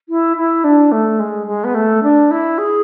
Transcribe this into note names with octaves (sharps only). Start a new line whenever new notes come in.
E4
E4
D4
A3
G#3
G#3
B3
A3
D4
E4
G#4